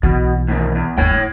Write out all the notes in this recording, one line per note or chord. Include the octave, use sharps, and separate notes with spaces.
B1 B2 E3
A2 D#3
E2
D#2 G#2 C#5 G5
A3